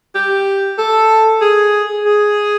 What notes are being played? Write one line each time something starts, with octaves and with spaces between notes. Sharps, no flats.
G4
A4
G#4
G#4